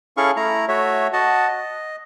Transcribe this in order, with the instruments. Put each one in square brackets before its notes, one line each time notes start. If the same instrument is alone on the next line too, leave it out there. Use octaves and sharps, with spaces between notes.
[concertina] C#4 E4 G#4 A4 F5 C#6
A3 E4 A#5
A3 F#4 C#5 E5
F#4 D#5 F#5 A5
D#5